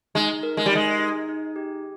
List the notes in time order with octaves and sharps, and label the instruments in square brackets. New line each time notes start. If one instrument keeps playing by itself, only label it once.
[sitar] G#3 [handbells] D#4
[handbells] A#4
[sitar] G#3
G3
[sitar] G#3 [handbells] D#4
[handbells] D#4
D#4
G4